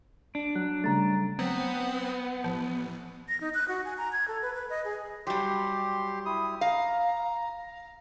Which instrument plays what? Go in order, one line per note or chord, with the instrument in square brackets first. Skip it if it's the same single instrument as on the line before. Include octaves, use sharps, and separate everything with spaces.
[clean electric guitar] D4
[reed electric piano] F#3 [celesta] F#6
[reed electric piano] C#3 G3 A3 [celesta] A#5 A6
[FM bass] F#3 [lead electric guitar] B3 [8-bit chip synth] C4 [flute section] F#5
[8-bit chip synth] A1 [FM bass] F3
[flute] A#6
D#4
F#6
F#4
G#5
A#5
G#6
A4
B4
B4
D#5
G#4
[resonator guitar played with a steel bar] F#3 G3 [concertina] G4 C6
[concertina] E4 D#6
[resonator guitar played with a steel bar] F5 [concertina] A#5